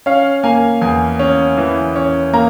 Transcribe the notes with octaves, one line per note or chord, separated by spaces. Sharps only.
C#4 F5
A#3 G#5
E2 G#5
C#4
E3
C#4
A#3 A#5